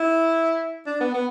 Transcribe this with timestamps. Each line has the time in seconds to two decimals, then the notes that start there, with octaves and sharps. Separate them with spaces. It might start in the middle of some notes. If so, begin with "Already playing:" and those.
Already playing: E4
0.86 D4
1.01 B3
1.14 B3